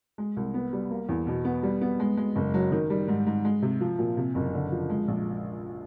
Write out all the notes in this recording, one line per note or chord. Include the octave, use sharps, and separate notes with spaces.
G#3
C2
B3
G3
A#3
E2
B2
B3
G3
B3
G#3
G#3
F#1
F#3
D#3
G3
G#2
G#2
G#3
C3
F3
A#2
C3
F#1
D3
F3
G#3
A#1